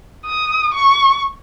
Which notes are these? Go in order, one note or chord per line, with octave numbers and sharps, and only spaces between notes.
D#6
C#6